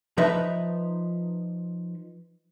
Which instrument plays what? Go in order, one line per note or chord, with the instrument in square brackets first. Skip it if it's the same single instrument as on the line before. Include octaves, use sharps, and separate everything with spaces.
[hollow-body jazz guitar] F3 D#4 B4 E5